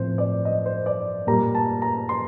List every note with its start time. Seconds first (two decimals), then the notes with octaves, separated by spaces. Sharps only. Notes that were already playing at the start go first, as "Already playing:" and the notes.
Already playing: A2 F3 A3 C4 C5
0.18 D5
0.45 D#5
0.66 C5
0.86 D5
1.27 A#2 G3 A#3 A#5
1.55 A5
1.82 A#5
2.09 C6